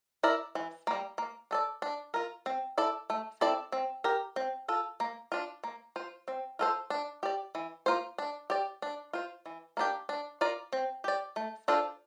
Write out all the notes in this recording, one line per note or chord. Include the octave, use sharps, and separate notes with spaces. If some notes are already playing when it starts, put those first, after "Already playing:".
E4 A#4 D5
E3
G3 A#3
A#3
D4 A4 D5
D4
F4 A#4
C4
E4 A4 D5
A3
C4 E4 A4 D5
C4
G4 A#4
C4
F4 A4
A#3
D4 F4
A#3
F4 C5
C4
F4 A4 C5
D4
G4 D5
E3
A#3 F4 C5
D4
G4 D5
D4
F4 C5
E3
A#3 D4 G4
D4
F4 A#4 D5
C4
G4 D5
A3
D4 F4 A4 C5